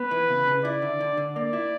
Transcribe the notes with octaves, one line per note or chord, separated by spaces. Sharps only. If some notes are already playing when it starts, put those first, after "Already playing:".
Already playing: B3 B4
E3
C#3
C#3
E4 D5
D3
D3
D3
A#3 D5
E4